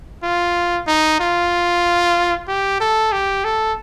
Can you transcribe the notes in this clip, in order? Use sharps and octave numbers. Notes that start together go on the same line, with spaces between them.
F4
D#4
F4
G4
A4
G4
A4